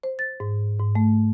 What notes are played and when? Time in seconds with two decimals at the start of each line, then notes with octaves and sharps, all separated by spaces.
0.03 C5
0.19 A6
0.40 G#2
0.79 G#2
0.95 A3